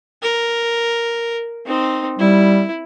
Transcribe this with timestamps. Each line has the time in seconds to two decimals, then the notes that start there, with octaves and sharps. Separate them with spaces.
0.22 A#4
1.66 C4 D#4
2.19 G3 E4